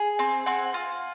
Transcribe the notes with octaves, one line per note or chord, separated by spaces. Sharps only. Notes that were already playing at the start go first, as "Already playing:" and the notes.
Already playing: G#4
C4
C4 F#5 G#5
F4